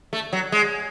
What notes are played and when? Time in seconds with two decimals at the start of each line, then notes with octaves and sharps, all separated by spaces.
0.13 A3
0.33 F#3
0.52 G#3